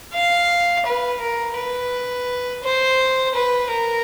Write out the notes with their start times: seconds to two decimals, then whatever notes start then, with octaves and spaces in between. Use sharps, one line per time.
0.14 F5
0.86 B4
1.21 A#4
1.57 B4
2.63 C5
3.34 B4
3.71 A#4